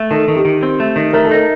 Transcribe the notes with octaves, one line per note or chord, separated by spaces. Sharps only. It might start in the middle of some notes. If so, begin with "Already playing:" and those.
Already playing: A3
D#3 A4
D#3
G4
D#3
C4
A3
D#3
A3 A#4
A4
D#4 A#4